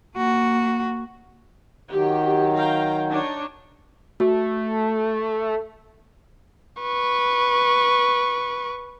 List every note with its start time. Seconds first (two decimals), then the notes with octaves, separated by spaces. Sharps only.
0.16 A#3 F#4
1.91 D#3 F#3 G4
2.54 F5 G5 A#5
3.11 D4 D#4 C#5
4.20 A3 F#4
6.82 B4 C#6